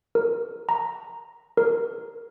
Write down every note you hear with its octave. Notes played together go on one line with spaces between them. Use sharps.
A#4
A#5
A#4